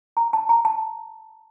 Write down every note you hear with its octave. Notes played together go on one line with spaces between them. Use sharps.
A#5
A5
A#5
A5